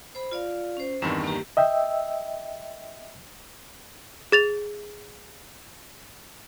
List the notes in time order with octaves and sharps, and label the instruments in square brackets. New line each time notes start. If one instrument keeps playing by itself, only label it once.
[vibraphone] C5 B5
F4 D5 F5
C#4 C5
[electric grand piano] E2 G2 D#3 [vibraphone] C4
[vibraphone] A#3 G4
[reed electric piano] D#5 E5 G5 E6
[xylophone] G#4 A6 F7